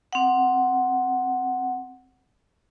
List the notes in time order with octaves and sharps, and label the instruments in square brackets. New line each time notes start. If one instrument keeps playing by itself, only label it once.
[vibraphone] C4 F#5